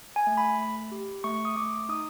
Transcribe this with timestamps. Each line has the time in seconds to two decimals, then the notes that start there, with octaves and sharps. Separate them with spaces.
0.16 G#5
0.27 A3
0.37 B5
0.59 A3
0.91 G4
1.24 A3 C#6
1.45 D#6
1.56 A3 D6
1.89 D#4 D#6